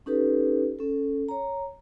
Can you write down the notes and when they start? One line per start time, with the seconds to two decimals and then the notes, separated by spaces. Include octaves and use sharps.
0.06 C#4 D#4 G4 A4 B4
0.79 C#4 A4
1.28 C#5 A#5